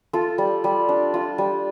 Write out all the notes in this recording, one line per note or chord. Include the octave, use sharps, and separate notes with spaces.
F4 A4
G3
G3
D4
F4
G3